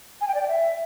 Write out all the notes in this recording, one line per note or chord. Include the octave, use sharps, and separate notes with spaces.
G#5
G5
D5
G5
E5